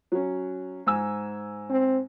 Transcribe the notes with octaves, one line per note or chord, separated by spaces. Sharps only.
F#3 C#4
G#2 G#5 E6
C4